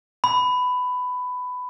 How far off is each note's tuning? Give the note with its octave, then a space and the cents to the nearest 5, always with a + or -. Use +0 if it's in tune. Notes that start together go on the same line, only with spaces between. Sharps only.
B5 +15